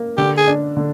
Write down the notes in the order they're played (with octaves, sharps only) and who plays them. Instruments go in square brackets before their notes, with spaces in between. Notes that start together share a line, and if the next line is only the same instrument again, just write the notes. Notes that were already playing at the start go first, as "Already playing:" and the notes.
Already playing: [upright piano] A#3
[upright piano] D3 [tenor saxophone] G4
[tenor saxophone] G#4
[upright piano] D4
D3